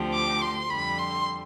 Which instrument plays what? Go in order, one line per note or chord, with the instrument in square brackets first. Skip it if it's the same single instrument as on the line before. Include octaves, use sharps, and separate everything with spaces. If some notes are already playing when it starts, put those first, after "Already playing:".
Already playing: [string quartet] D2 D3 F3 C4 G4
[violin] D6
C6
[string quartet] F2 D3 G3 [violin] B5
[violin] C6